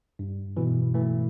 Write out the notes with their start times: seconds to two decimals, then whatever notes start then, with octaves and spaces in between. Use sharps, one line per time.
0.19 G2
0.57 B2 E3
0.94 E3 A3